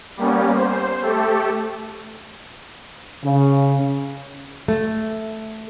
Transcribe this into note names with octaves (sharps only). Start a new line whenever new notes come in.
G3 A#3 B3 C#4
C5
A3 G4 A4
C#3
A3